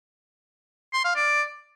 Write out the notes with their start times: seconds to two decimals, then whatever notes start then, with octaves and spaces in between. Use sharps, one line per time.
0.93 C6
1.05 F5
1.16 D5